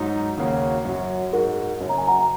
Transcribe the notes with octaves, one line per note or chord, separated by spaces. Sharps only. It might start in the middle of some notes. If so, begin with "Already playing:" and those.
Already playing: G#2 F#3 D#4
D#2 C#3 A#3 C#4 F#4
F#2 F#3 C#4 F#4
G#2 G#3 F#4 A#4
F#1 F#2 F#3 C#4
A#5
G#5
F#5 A#5